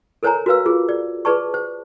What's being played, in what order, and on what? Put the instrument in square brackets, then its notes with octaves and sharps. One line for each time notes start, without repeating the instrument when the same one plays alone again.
[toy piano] A4 A#4 C5 C#5 G#5 A#5
F#4 A#4 B4 F5 E6
F4 G#4
D5
G#4 B4 D5 A5 C#6
C5